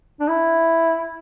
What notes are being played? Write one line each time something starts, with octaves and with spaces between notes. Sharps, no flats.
D4
E4